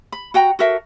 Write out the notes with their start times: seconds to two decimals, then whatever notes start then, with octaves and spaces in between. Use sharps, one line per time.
0.12 B5
0.34 F#4 F#5 G5 A#5
0.59 F#4 A4 A#4 E5